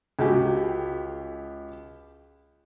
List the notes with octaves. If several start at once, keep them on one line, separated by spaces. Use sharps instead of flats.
C#2 F#4 G4 G#5